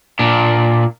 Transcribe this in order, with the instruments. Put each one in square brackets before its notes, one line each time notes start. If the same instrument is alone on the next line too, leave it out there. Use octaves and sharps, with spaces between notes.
[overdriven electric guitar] A#2 D4